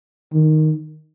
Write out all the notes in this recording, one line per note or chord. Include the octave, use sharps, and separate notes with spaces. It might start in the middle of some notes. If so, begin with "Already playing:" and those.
D#3